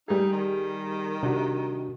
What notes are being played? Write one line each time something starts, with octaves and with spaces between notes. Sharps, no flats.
G3 D#4 G#4
D#3
C3 D4 F#4